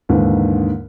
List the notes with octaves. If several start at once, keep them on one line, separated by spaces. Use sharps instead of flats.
D#2 G#2 D3 E3